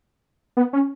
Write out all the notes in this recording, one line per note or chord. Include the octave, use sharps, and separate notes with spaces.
B3
C#4